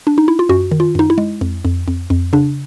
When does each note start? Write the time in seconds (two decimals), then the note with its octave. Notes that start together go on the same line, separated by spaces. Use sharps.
0.07 D4
0.18 D#4
0.28 E4
0.39 F4
0.49 F#2 F#4
0.71 D#3
0.80 F4
0.95 F#2 D#4
1.10 E4
1.18 G#3
1.41 F2
1.65 F2
1.88 F2
2.10 F2
2.33 C#3 D4